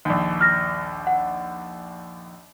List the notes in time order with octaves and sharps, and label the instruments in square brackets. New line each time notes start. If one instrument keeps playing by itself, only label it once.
[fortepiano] A#1 D#2
[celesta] F6 A#6
F#5